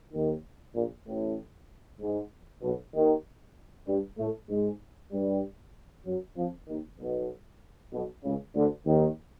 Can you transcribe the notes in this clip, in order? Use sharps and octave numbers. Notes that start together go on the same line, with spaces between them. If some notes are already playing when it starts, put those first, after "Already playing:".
D#2 D#3
A#1 A#2
A1 A2
G#2
B1 B2
D#2 D#3
G2 G3
A2 A3
G#2 G#3
G2 G3
F#2 F#3
F2 F3
D#2 D#3
B1 B2
B1 B2
C#2 C#3
D2 D3
D#2 D#3